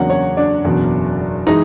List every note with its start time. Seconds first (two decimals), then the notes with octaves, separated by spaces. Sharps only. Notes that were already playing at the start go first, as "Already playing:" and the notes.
Already playing: E2 C#3 F#3 A#3 D4 F#4 F#5
0.10 C#4 C#5
0.37 D4 D5
0.65 F#1 E2 B2
1.47 E3 G#3 D#4 D#5